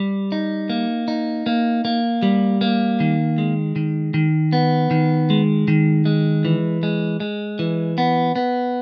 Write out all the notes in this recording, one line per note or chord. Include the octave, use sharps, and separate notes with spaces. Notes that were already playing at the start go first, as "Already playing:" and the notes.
Already playing: G3
D#4
A#3
D#4
A#3
A#3
G3
A#3
D#3
G#3
D#3
D#3
B3
D#3
G#3
D#3
G#3
E3
G#3
G#3
E3
B3
B3